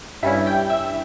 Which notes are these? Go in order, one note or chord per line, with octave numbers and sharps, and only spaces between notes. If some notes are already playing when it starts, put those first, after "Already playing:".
G2 G3 C#4 E4 E5
G5
E5